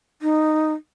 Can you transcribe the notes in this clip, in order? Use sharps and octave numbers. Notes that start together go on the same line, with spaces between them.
D#4